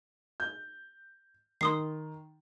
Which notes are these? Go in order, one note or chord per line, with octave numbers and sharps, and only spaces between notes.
G6
D#3 C6 D#6 C7